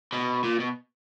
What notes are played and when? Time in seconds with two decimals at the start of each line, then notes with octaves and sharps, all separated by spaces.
0.12 B2
0.44 A#2
0.60 B2